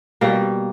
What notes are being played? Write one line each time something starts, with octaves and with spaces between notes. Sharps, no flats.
B2 G3 A#3